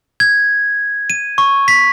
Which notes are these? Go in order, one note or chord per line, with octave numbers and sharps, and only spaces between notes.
G#6
D#7
C#6
B6